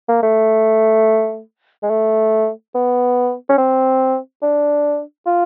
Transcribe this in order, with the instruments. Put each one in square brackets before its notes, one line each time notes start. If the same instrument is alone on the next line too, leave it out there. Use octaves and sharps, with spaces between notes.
[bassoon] A#3
A3
G#3
A3
B3
C#4
C4
D4
F4